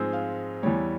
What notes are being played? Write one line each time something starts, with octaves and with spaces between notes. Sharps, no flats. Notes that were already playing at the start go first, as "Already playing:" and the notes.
Already playing: G#2 F3 G#3 C4 E6
F5
E2 E3 G3 C#5